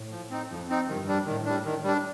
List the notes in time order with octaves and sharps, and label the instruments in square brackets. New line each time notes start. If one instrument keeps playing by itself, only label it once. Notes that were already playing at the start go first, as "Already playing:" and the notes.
Already playing: [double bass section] A2
[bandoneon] F3
C4 D#4
[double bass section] F2 [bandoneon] F3
[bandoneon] C4 D#4
[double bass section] G2 [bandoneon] D#3
[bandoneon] G3 D4
[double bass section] A2 [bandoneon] D#3
[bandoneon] G3 D4
D#3
G3 D4